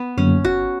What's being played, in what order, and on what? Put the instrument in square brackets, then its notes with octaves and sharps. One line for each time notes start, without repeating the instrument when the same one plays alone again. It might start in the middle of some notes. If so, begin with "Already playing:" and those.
Already playing: [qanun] B3
[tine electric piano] F#2 D3 F#3 A#3 [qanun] C#4
[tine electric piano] G1 [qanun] F#4